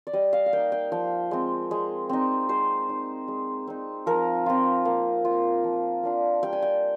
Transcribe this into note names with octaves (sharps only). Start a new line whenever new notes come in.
D5
G3 D#5
F5
F5
A#3 D#4 G5
G5
F3 G5
G#3 C4
G#3
C4 D#4
G#3 C5
D#4
G#3
C4 D#4
F3 A#4
C4 F4
A#3
F4
F3
A#3 D4 F4
G3 G5
G#5
G5